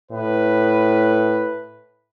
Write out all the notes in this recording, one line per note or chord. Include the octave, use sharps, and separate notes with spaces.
A2 B4